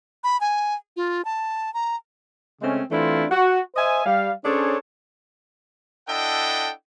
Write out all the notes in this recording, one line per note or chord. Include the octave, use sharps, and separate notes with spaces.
B5
G#5
F4
A5
A#5
C#3 G#3 A3 C4 C#4
E3 A3 C4 D4 E4 F4
F#4
C5 D#5 E5 G#5
G3 F5
C#4 D4 G#4 A4 C5 C#5
D4 E4 A4 D#5 F#5 G5